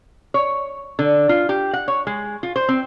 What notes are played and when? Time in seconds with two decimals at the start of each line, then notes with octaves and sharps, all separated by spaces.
0.34 C#5
0.99 D3
1.29 F4
1.49 G4
1.73 F#5
1.88 C#5
2.07 G#3
2.43 F4
2.56 C5
2.69 C4